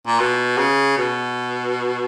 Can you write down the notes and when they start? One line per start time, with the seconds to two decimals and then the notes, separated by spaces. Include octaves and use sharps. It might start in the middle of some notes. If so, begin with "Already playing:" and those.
0.07 A#2
0.20 B2
0.58 C#3
0.97 B2